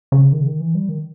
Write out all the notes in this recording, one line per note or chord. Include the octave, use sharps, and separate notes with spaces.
C#3
D#3
C#3
D#3
E3
G3
D#3